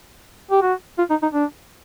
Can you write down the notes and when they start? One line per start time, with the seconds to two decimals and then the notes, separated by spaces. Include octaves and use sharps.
0.51 G4
0.63 F#4
0.98 F4
1.10 D#4
1.22 D#4
1.34 D4